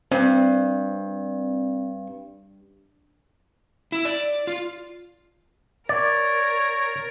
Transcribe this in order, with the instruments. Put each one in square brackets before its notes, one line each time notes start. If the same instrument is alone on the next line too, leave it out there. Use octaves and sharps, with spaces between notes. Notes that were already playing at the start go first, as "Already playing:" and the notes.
[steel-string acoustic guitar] G2 [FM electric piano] C4
[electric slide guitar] E4
D5
F4
[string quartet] A#4 [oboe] C#5 [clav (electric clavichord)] D5 [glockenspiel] A6